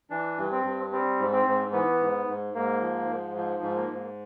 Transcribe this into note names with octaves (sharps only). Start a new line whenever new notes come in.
E3 D4
G2
C4
G2
G3 C4
G#2
C4
G#2
E3 B3
G#2
G#2
G#2 A#3
F3
G#2
F3
G#2
A#3
G#2